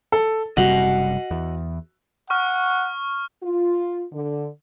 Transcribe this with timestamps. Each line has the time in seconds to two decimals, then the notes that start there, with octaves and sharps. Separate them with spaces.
0.12 A4
0.57 F#1 C3 G3 F#4 D#5 F#5
1.31 E2
2.30 F#5 C#6 F6
3.43 F4
4.12 D3